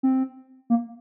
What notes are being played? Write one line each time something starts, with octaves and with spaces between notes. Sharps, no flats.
C4
A#3